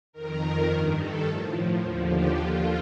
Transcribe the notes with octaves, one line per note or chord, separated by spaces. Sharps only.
F2 D#3 A#4
G2 D#3
A4
A2 F3
D#2 D3 F3
G4
D#2 D3 F3 F4